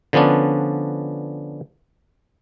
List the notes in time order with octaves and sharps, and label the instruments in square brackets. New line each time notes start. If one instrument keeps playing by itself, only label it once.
[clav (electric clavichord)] D3 F3 B3 C#4 D4